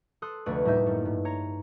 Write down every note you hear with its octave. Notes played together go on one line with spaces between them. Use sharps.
A4 C6 D#6 F#6
F1 D2 A3 D4 B4 C#6
A2 G3 A#3 D#4 E5 G6
F#2 A3
G2
C#5 A#5